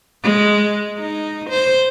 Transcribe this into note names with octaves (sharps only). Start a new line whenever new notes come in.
G#3
D#4
C5